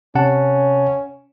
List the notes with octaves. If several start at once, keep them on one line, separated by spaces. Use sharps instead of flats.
C3 C#4 F#5 A5